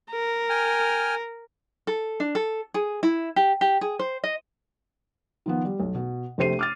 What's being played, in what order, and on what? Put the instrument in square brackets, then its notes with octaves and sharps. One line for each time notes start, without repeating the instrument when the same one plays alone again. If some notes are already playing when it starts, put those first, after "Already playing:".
[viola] A#4
[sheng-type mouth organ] G5 G#5 F6
[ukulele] A4
D4
A4
G#4
E4
G4
G4
G#4
C5
D#5
[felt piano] D#3 F3 B3
G3
B1
B2
A#1 C3 A3 C5 C7 D#7
D6 F6 A6